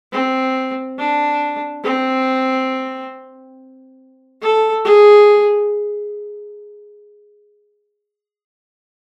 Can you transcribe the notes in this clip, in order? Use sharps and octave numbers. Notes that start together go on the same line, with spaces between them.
C4
D4
C4
A4
G#4